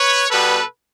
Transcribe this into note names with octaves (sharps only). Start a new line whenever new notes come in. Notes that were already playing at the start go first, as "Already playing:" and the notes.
Already playing: B4 C#5
B2 G3 B3 A4 B4